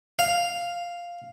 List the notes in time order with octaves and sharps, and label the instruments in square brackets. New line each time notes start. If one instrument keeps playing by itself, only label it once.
[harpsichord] F5